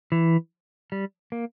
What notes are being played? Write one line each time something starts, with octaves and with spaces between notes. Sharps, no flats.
E3
G3
A#3